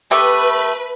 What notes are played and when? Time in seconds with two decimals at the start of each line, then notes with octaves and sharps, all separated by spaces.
0.11 A3 G4 A4 B4